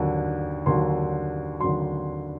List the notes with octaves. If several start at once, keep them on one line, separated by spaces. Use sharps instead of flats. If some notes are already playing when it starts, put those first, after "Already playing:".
Already playing: D#2 D3 F#3
D#2 D3 F#3 C6
D#2 D3 F#3 C6